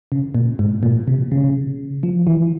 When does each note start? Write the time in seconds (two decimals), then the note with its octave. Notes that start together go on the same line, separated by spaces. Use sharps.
0.12 C#3
0.35 A#2
0.59 G#2
0.83 A#2
1.08 C3
1.32 C#3
2.03 F3
2.27 E3